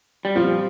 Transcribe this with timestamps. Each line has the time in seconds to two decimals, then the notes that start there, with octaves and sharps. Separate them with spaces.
0.25 G3
0.35 A#2 F3 G3 C4 F4